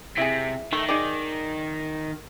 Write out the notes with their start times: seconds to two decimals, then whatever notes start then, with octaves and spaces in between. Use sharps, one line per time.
0.17 C3 E4 G#4
0.73 D#3 A3
0.88 D#4 G#4 D5